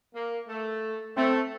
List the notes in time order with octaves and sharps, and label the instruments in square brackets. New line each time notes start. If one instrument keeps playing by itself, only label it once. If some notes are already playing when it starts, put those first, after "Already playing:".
[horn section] A#3
A3
[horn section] A3 [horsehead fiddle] C4